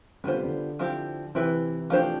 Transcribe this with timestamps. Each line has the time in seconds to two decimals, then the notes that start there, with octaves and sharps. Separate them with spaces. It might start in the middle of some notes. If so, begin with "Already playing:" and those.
0.24 D3 G3 B3 F4 C5
0.34 C3
0.44 D3
0.79 F3 C4 E4 G4
1.35 C3 E3 C4 E4 B4
1.90 F3 A3 D4 G4 C5